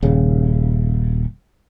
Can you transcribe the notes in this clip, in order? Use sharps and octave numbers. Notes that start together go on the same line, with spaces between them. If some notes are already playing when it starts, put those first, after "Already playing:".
D#1 C#3